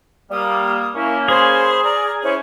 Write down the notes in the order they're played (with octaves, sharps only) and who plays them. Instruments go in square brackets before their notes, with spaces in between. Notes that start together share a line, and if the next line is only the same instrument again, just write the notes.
[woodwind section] G3 A#3 [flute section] D#6
[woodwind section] A#3 C#4 [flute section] E4
[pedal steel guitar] G#4 [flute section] C5 B5 C6
[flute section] D5 A#5 F6
[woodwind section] C#4 [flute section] E4 C5 C#5